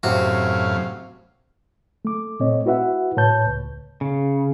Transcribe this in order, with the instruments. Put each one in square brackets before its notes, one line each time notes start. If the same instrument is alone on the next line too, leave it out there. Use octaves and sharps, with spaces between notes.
[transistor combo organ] F#2 A2 F5 [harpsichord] C3 F#4
[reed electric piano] A3 D6
A#2 A3 C4 C#5 D#5
E4 F#4 B4 E5 F#5
A2 B4 C#5 A5 G6
C#2
[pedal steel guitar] C#3